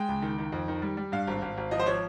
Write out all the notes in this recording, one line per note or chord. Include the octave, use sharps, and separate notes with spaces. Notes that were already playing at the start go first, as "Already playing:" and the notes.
Already playing: G#3 G5
C#2
D#3
D#3
F2
D#3
G3
G3
G2 F5
G#1
G#1
G#1
F3 D#5
C5
F3 C#5